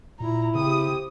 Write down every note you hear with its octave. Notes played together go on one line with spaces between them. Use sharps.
A#2 E4 A#5
C#3 C4 G4 D#6